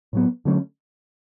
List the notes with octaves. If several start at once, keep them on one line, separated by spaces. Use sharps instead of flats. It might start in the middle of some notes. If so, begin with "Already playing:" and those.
A2 F#3 B3
D3 F#3 A3 C#4